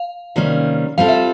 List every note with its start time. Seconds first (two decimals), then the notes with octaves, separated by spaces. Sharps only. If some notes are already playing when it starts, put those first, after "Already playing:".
Already playing: F5
0.36 C3 D#3 G3 A#3 C#4
0.98 G3 C4 F4 A4 F5
1.09 E5